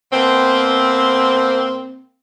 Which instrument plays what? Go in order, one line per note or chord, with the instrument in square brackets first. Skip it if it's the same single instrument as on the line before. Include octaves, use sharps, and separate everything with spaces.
[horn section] B2 A#3 C4